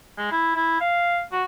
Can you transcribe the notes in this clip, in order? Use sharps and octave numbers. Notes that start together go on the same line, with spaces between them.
G#3
E4
E4
F5
F#4